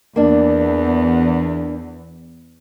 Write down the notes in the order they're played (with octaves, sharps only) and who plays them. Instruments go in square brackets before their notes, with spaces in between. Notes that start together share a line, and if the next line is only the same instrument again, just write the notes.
[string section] E2 [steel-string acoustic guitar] A#3 D4